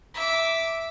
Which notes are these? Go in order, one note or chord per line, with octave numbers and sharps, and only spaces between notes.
E5 D6